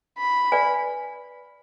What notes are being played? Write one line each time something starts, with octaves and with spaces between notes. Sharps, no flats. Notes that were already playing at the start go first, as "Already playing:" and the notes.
B5
B4 D5 G#5